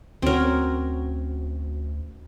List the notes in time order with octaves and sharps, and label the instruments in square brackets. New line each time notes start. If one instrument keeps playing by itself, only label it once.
[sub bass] D2 [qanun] C4 A#4 [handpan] C#4 F#4 C#5